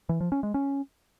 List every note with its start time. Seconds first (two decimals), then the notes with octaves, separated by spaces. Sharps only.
0.09 E3
0.21 F3
0.32 C#4
0.43 G#3
0.54 C#4